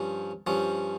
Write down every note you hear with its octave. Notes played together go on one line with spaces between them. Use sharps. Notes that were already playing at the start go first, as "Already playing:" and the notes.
Already playing: G2 F3 C#4
G2 F3 C#4